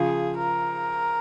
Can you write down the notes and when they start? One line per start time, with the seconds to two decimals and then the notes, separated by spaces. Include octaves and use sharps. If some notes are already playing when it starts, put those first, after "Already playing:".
Already playing: C#3 F3 G#4
0.37 A#4